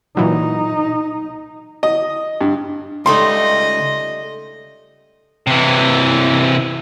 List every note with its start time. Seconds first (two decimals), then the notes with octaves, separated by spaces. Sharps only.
0.17 A#2 E3 F#3 D#4
1.83 D#5
2.41 G2
3.06 C#2 G3 A3 D#4 D#5 C6
5.47 C3 E3